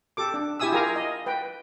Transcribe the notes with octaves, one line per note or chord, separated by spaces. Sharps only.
G4 A4 D6
D4
E4 G4 E5 G#5 D#6 E6
F4 G4 G#4 A#4 G#5 A#5
D#5
B4 G5